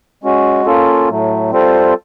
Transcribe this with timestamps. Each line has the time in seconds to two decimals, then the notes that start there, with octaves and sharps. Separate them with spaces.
0.24 G#3 C#4 F#4
0.66 A#3 C#4 F4 A4
1.09 A2 F#3 A3
1.51 G3 C4 F4 A4 C5